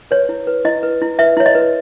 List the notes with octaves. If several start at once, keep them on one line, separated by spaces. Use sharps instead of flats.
B4 C#5
E4
B4
E4 D#5
B4
E4
B4 E5
E4 C#5
D#5
B4